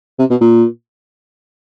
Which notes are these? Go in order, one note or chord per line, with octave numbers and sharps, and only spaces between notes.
C3
B2
A#2